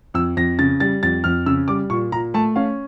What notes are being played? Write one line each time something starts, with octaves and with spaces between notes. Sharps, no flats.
F2 E6
F2 A#6
C#3 A6
G3 A6
F2 A6
F2 F6
C#3 E6
G3 D6
A#2 C#6
A#2 A#5
A3 A5
C#4 F5